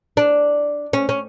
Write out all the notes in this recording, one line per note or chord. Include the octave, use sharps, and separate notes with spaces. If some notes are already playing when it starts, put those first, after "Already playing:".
D4
C#4
C#4